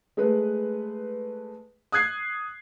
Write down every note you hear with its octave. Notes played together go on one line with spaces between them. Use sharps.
G#3 A3 B4
D#6 F#6 G#6 C7